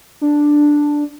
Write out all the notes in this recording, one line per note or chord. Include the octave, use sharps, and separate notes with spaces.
D4